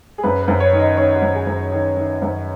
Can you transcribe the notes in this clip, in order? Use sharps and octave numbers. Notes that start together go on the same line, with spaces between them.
G#4
F#2 B4
B4
F#2
C#5
D#3
D#5
D#3 C#5
F#4
F#2
G#4
F#2
D#3
D#3
F#2